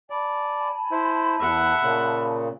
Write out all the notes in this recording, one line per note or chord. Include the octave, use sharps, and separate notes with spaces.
D5 G#5 A5 B5
E4 C5
E2 E5 F#5
A#2 C#3